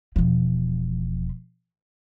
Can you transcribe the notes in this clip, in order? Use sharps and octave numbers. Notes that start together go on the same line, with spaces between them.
E1 F3